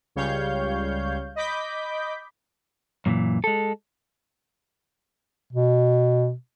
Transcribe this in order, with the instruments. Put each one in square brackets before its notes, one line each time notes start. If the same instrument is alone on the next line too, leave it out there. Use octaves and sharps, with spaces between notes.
[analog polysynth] C#2 C#3 G3 C#5 F5 G6
D#5 B5 D6 G6 B6
[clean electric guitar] F#2 A#2 D3 E3
G#3 A4
[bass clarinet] B2